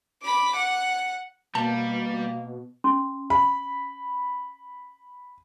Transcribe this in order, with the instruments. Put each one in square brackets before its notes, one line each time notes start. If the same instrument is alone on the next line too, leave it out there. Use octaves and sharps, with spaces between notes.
[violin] B5 D6
F#5
[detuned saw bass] B2 [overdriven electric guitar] G3 [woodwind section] A#3 [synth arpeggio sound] A5
[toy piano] C#4 C6
[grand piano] B5